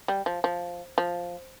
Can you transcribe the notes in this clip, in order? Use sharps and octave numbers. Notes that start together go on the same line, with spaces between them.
G3
F3
F3
F3